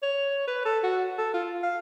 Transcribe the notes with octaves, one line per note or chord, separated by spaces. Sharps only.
C#5
B4
A4
F#4
A4
F4
F5